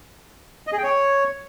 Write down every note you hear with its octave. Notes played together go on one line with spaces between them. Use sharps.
D#5
G#4
G5
C#5